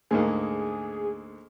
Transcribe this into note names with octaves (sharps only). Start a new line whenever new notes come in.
D2 G#2 A#3 G#4